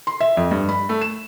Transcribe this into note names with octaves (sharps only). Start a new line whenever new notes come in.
C6
E5
F2
G2
B5
A3
E7